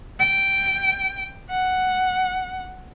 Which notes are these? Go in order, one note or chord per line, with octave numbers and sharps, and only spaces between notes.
G5
F#5